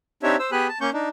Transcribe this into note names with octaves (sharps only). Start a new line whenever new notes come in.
C4 D4 D#4 G4 C#5 E5
C5 E6
B3 G4 G#4 G#5 B5 F#6
A5
A#3 C#4 C#6 G6
D4 D#4